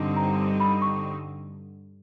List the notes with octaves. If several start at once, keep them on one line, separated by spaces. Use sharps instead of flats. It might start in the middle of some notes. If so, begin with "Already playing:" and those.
Already playing: G2 D3 G3 C4 D#4
A#5
B5
C#6